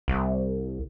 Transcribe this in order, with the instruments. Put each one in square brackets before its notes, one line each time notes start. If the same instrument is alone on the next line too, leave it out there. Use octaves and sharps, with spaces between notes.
[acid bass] C2